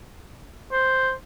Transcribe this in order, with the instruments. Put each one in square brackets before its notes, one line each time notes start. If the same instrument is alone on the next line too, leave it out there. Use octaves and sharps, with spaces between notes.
[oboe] C5